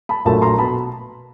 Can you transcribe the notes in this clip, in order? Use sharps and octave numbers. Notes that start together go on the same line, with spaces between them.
A5 B5
A#1 A#2 F#3 A3 A5 B5
A#5 C6
B2 A5 B5